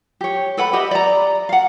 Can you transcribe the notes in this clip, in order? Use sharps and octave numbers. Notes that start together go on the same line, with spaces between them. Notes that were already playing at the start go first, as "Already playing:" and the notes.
G4 C#5
A4 B4 F#5 B5
G4 B4 D#5 E5
D5 A#5
F5 F#5